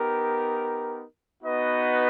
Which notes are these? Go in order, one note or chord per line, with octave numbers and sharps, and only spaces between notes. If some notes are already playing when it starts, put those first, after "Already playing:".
Already playing: B3 D#4 G4 A#4
B3 D#4 F#4 B4 D#5